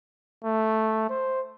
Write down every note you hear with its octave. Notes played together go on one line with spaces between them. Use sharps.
A3
C5